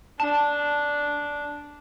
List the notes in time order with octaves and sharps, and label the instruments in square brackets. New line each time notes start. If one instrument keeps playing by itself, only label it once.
[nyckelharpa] D4 [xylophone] A5